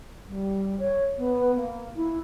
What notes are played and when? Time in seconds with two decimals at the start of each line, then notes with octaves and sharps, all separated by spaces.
0.27 G3
0.79 C#5
1.17 B3
1.55 A#3
1.96 E4